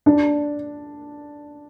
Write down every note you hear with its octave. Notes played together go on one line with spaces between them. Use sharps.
D4